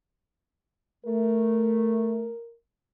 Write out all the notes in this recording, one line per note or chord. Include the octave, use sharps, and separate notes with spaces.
A3 A#4